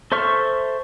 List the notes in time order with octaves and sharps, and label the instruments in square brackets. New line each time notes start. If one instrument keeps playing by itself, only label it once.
[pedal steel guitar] A4 C5 E5 C#6 F6